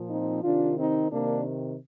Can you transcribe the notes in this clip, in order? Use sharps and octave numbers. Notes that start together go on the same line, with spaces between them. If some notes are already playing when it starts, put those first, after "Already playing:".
Already playing: A#2 F3
C4 D#4
C3 D#3 D4 F4
C4 D#4
C3 D#3 A#3 D4